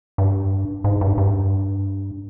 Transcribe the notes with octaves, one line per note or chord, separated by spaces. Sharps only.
G2
G#2
G2
G2